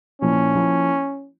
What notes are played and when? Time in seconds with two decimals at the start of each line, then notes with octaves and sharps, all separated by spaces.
0.22 A#2 F3 A#3 C#4 E4
0.55 F3 A#3 E4